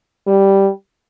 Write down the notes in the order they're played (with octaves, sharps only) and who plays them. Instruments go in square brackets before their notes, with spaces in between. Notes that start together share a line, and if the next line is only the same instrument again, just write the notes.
[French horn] G3